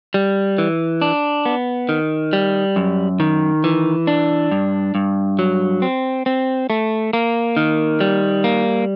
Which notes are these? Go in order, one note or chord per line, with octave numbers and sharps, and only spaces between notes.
G3
E3
D4
B3
D#3
G3
F#2
D#3
E3
D4
G2
G2
F#3
C4
C4
A3
A#3
D#3
G3
A#3